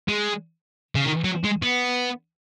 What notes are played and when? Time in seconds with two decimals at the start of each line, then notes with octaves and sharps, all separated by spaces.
0.08 G#3
0.95 C#3
1.05 D#3
1.25 F#3
1.44 G#3
1.62 B3